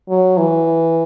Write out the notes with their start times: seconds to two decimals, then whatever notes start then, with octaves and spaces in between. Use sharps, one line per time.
0.09 F#3
0.38 E3